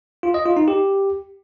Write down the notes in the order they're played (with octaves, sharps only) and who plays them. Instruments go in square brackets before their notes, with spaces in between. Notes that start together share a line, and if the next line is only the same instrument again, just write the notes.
[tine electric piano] F4
D#5
F4
D#4
G4